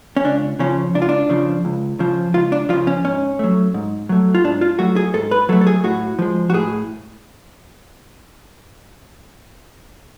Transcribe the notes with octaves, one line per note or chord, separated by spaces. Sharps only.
C#4
C#2 D4
C#3 F3 C#4
C#2 D4
F4
D4
C#3 F3
C#2
C#3 F3
C#2 F4
D4
C#3 F3 F4
C#4
G#2 C#4
F#3 A3
G#2
F#3 A3
F4
G#2 D4
F4
F#3 A3 F#4
G#4
G#2 A4
B4
F#3 A3 A4
A4
G#4
A2 F#4
F3 G#3
F#4
A2 G#4